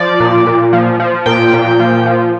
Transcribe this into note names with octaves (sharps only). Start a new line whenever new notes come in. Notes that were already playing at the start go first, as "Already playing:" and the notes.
Already playing: F3 D5
A#2
A#2
F3
F3
A#2 G5
A#2
F3
F3